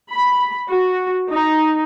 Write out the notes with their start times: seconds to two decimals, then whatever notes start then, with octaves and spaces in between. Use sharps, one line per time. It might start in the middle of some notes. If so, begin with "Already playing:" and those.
0.11 B5
0.69 F#4
1.30 D#4